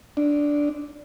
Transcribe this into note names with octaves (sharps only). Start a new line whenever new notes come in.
D4